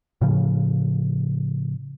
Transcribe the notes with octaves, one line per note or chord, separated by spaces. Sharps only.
A2 C#3 F3